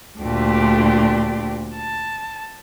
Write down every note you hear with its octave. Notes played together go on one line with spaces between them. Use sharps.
D2 A#2 A3 D4 G4
A5